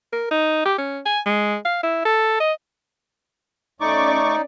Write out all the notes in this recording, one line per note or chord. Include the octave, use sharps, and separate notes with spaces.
A#4
D#4
G4
C#4
G#5
G#3
F5
E4
A4
D#5
A3 C#4 D#4 D5 C#6 D6